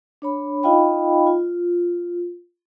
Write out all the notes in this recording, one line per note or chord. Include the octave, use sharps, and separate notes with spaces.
D4 C#5 B5
D#4 F4 D#5 F5 G5 B5
F4